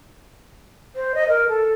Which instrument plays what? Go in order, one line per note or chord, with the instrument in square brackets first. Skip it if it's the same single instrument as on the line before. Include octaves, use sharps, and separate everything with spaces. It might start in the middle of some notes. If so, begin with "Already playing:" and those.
[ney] C5
D#5
A#4
A4